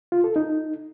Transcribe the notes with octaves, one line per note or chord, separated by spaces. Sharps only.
F4
A4
D#4